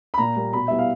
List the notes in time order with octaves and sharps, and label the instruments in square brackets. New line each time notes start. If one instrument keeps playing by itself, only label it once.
[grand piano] B5
A#2 A#5
G3 A#3
B2 B5
G3 B3 E4 E5
F5